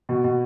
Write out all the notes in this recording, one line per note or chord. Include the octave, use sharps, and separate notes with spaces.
B2
B2